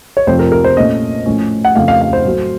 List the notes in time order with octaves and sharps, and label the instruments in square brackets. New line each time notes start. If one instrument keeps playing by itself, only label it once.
[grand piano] C#5
F2 C3 F3 A3 C4 C5
A#4
A#4
C5
A#2 A3 C#4 D#5
A2 F3 A3 C#4
F#5
F2 C#3 A3 C4 F5
F5
F5
C5
A2 F#3 A3